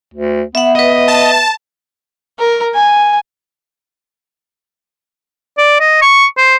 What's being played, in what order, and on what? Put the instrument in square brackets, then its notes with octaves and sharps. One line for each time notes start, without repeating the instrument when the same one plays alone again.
[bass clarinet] D2
[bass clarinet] B3 [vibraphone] E5 F#5
[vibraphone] B4 E5 [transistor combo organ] D#5
[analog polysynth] A5
[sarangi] A#4
G#5
[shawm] D5
D#5
C#6
C5